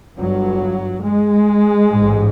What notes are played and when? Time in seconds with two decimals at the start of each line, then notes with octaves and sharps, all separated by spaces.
0.18 G1 G2 F#3
1.04 G#3
1.91 A1 G#2